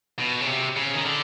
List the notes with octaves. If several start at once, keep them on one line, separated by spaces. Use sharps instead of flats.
B2
C#3
C3
C#3
D#3
D3